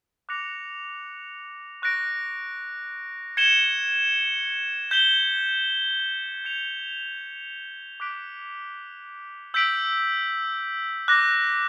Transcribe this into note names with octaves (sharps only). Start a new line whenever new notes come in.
D6 F#6 A#6 C#7 F7
C#6 F#6 A#6 D7
G#6 C#7 E7 G7
G6 B6 E7 G7
G#6 C#7 F7
D6 F#6 B6 D7
E6 G6 B6 D7 F#7
D6 F#6 A#6